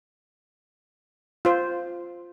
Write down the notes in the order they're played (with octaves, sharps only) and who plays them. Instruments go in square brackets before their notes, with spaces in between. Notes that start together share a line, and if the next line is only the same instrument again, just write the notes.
[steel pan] F4 C5